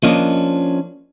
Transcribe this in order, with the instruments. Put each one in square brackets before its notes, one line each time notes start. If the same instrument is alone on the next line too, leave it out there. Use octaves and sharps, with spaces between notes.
[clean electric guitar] F3 C#4 D4 [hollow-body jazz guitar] A#3 D#5